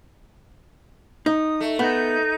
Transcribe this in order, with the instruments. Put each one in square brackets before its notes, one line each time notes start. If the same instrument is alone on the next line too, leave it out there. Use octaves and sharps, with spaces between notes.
[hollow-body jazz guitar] D#4 [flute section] D#6
[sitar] A3
[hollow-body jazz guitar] B3 [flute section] D#4 G6